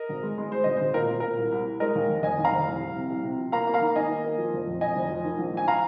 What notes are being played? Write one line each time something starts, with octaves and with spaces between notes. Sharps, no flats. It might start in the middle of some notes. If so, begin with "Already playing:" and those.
Already playing: A#4 D#5
G#1
G#3
G#3
G#3 C5
G#1 D#5
G#1 C5
A#2 A#4
A#2
A#2 A#4
C2
C2
C2
G#3 A#4 D#5
D#2
F1
F1 D#5 G#5
D#2
F5 A#5
F1
C2
C2
C3
C2
C3
F3
A#3 F5 A#5
A#3
F5 A#5
D#3
D#3 D#5 G#5
A#3
A#3
F3
F1
F2
F2 D#5 G#5
F1
F3
D#3
A#1
A#1 G#5
F5 A#5